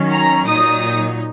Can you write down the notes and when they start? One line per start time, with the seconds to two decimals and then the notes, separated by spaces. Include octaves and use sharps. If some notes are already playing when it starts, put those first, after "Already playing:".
Already playing: D#3 F#3 C#4
0.12 A#5
0.47 A#2 F#3 D#4 D#6